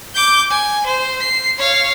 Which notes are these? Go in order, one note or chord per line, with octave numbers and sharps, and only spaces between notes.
D6 G6
G#5
C5
C7
C#5 F5